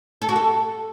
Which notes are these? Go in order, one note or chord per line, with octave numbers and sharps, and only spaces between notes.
A4
F#4
A4